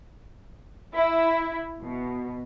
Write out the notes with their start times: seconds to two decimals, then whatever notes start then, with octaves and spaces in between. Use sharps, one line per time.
0.94 E4
1.82 B2